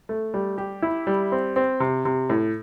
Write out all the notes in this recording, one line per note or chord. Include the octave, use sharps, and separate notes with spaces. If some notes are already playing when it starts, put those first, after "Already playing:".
A3
G3
G4
E4
G3
C4
C4
C3
C3
A2